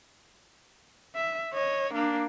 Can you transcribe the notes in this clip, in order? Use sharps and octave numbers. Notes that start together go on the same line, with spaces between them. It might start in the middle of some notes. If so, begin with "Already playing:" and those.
E5
C#5 D#5
A#3 D4